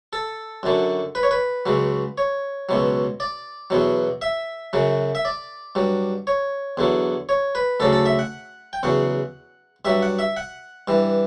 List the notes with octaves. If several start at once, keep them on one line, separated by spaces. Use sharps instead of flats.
A4
F#2 D3 F#3
B4
C#5
B4
C#2 C#3 F#3
C#5
C#2 B2 F#3
D5
E2 B2 F#3
E5
F#2 C#3 F#3
E5
D5
G2 F#3
C#5
E2 D3 F#3
C#5
B4
D2 C#3 F#3 A4
A4
E5
F#5
G5
E2 C#3 F#3 F#5
G2 F#3 E5
F#5
E5
F#5
G2 E3